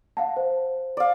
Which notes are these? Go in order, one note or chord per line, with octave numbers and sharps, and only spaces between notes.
F5 F#5 A5
C5
D5 F5